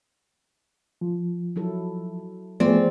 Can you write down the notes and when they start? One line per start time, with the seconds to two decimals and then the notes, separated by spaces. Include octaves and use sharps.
1.01 F3
1.56 F#3 E4 A4
2.60 E3 F3 A3 B3 C4 G#4 D5